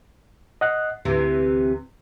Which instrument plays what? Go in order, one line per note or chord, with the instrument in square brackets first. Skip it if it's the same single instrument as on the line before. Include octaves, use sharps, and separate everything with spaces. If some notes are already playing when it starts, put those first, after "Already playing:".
[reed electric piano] D#5 F#5 F#6
[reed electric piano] D2 [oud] C3 E3